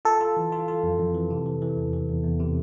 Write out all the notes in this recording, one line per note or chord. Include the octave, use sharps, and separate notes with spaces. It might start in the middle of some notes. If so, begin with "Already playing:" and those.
F4 A4
F4
E3
F4
F4
F2
F2
E3
C3
E3
E3
E2
E3
E2
E2
C3